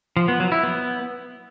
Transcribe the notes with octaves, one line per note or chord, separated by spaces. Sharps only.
F3
B3
F#3
E4
B3